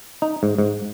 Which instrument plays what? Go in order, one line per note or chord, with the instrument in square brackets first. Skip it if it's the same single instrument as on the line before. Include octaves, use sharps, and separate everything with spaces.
[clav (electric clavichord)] D#4
G#2
G#2